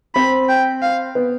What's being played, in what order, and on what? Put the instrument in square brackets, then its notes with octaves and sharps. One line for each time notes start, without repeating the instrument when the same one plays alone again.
[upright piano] C4 C5 [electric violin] B5
[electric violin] G5
F5
[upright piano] B3 B4